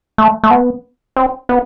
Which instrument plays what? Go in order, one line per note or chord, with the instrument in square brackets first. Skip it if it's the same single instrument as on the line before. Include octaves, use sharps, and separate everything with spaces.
[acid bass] A3
A3
B3
C4
B3